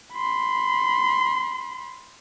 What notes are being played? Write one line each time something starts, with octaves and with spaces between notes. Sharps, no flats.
B5 C6